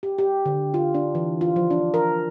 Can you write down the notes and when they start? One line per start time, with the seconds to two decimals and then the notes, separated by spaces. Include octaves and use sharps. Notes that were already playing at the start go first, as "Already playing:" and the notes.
0.03 G4
0.18 G4
0.46 D3
0.74 F4
0.95 D4
1.15 E3
1.41 F4
1.56 F3
1.70 D4
1.94 A#4